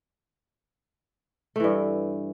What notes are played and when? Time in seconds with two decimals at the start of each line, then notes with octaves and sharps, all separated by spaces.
1.56 A3
1.60 E3
1.64 G2